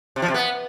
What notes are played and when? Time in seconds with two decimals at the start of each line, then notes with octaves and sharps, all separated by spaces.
0.16 C3
0.22 F3
0.28 C3
0.34 B3